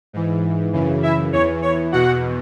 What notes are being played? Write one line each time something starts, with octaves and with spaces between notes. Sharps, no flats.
G#2 E3
F#2 C#3 E3
E4 E5
E2 E3 C#5
C#5
E2 B2 F#4 F#5